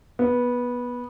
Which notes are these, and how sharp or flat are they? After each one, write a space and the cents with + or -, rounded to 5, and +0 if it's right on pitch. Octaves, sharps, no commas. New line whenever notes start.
B3 -15